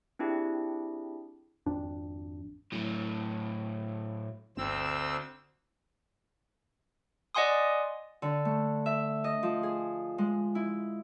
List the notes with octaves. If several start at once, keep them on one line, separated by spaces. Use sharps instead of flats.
C4 D4 E4 G4 G#4
G#1 F2 D4
A2 F#3
G1 D2 C4 E6
D5 D#5 F#5 G#5 C6 D#6
D3
A3
E5
D#5
F3
G#4
G#3
E4